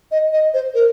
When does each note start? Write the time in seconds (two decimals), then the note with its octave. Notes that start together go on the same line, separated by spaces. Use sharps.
0.11 D#5
0.33 D#5
0.54 C5
0.75 A#4